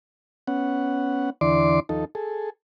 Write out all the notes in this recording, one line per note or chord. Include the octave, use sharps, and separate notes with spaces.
B3 C#4 F#5
E2 D3 E3 D5 C6 D6
D#2 F3 D#4 A4
G#4 A4